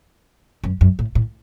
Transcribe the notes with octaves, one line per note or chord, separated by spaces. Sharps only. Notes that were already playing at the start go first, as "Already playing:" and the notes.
F#2
F#2
A2
A2